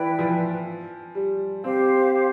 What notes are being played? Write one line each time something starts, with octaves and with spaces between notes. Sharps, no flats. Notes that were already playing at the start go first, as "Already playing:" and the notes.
Already playing: E3 E4 B4 D5 G5
F3
G3
C4 G4 C5 F5